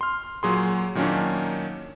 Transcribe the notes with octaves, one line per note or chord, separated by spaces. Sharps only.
C6 F6
A#2 F#3 G#4 C6
A#2 D#3 F#3 A#3 C#4 D4